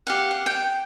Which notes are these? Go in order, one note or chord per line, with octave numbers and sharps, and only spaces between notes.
G4 F5 F#5
F#5
G5